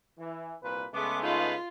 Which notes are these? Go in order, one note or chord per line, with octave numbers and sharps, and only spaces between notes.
E3
C2 A#2 B4
C#3 G#3 A3 B3 D6
B3 D#4 F4 B4 F5